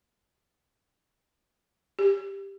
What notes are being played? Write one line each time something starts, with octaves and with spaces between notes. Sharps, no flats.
G4